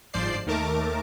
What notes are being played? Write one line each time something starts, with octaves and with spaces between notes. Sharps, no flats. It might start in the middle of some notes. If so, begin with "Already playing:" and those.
G1 G#2 F3 C5 D5 C7
D#2 D#3 A3 A#4 A5 D6